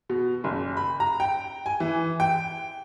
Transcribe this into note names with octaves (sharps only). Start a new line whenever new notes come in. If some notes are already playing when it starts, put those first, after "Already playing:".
B2
F#1
B5
A#5
G5
G#5
E3
G5